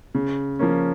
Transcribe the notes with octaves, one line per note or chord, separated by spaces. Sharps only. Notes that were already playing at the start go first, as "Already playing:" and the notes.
C#3
F3 A#3 C#4